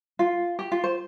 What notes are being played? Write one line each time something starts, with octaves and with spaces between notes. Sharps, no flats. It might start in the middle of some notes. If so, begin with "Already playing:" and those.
F4
G4
F4
C5